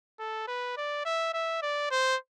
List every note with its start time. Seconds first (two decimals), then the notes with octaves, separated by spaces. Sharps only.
0.20 A4
0.48 B4
0.77 D5
1.05 E5
1.34 E5
1.62 D5
1.91 C5